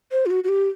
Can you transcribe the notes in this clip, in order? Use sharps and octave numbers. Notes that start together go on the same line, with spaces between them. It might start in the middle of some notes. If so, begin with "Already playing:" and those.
C5
F4
F#4
F#4
G4